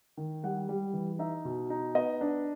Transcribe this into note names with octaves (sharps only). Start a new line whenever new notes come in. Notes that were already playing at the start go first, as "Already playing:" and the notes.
D#3
G3 F#5
G3
E3
D#4 E5
B2
D#4
B3 D#5
D4